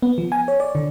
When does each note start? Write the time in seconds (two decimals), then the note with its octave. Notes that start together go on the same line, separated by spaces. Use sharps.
0.03 B3
0.18 F3
0.32 G#5
0.48 C#5
0.60 D5
0.75 D3